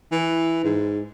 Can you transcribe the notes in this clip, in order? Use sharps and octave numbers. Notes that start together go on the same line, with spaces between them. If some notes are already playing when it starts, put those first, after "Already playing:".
E3
G#2